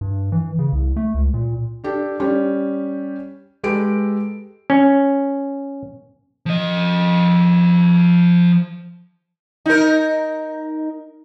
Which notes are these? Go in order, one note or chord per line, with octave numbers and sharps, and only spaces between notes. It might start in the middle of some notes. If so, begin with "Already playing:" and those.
G2
E3
C#3
C2
A3
C#2
A#2
D4 G4 A4
G3 C#4 G4
G#3 G4 A4 B4 D7
C#4
F3 D#5
D#4 A#4